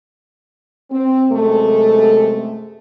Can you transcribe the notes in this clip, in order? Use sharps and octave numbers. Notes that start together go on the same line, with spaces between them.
C4
F#2 C3 G#3 A3